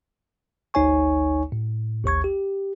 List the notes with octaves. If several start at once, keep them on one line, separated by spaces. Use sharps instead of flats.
G#1 D2 D#4 C#5 G#5 C#6
A2
A1 D#2 C#6 G#6
G4